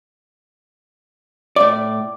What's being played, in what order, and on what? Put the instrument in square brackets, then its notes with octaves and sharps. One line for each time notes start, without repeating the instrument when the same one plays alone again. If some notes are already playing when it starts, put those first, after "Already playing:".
[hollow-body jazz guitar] A2 D5 [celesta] D6